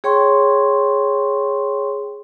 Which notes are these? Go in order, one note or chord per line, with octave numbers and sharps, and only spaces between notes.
G#4 C#5 G5 C6 C#6